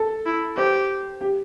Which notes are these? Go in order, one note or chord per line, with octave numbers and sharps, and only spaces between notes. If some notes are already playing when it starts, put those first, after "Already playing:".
Already playing: A4
E4
G4 C5
G4